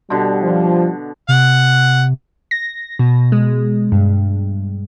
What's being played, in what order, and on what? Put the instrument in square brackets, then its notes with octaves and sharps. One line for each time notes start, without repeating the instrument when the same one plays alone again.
[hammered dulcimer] B2 D3 [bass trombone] G3
[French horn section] F3
[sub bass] C3 [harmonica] F#5
[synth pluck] A#6
B2
G#3
G2